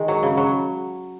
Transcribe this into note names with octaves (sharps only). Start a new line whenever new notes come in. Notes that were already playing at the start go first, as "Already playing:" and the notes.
Already playing: D#3 G#3
F#3
C#3
F#3